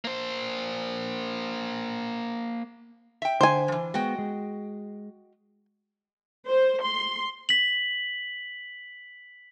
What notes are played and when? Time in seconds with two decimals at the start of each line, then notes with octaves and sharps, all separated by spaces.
0.05 A#3 C5
3.22 E5 G5
3.41 D3 C5 G#5
3.68 E3 F3
3.94 G#3 B3 F#4 D#5 G5
4.19 G#3
6.46 C5
6.82 C6
7.49 B6 F#7